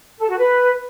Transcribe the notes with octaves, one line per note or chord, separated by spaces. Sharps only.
A4
F#4
B4